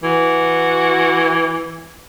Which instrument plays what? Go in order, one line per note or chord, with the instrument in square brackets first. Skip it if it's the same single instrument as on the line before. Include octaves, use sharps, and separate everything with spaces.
[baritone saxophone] E3 [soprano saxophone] F#4